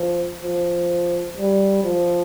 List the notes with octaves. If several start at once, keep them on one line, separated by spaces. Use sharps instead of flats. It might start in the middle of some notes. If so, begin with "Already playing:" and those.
Already playing: F3
F3
G3
F3